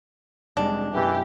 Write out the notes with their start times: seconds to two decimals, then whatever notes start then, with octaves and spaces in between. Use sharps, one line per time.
0.57 F1 G3 G#3 D4
0.94 F#2 B2 E3 G4